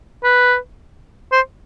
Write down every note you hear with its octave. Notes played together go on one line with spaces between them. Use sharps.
B4
C5